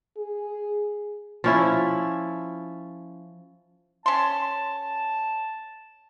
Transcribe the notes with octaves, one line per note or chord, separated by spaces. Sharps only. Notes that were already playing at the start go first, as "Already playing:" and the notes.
G#4
F3 C#4 E4
C#4 A5 C6